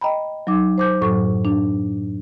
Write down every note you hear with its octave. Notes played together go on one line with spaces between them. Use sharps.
D#5 G5 A#5 B5
F#3 D#4 D6
C5 D6 G6
F#2 A2 F#3 A4 C#6
D4